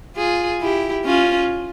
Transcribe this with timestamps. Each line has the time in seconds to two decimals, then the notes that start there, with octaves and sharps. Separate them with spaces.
0.16 F4 G#4
0.61 E4 G4
1.06 C#4 F4